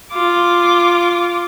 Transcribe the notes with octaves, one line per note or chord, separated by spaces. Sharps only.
F4 D6